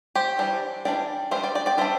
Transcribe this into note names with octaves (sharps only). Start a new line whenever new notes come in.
G4 C5
E3 G3 D4
E3 G3 D4 D5 G5
G3 D4 C5 E5
D5 G5
D5 G5
D5 G5
G3 D4 C5 E5